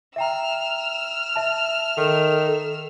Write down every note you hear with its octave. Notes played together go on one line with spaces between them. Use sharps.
E5 G5 A#5 E6 F6
E5 A5
D#3 A4